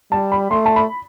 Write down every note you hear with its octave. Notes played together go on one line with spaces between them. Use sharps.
G3 A5
B5
A3 C6
A5
B5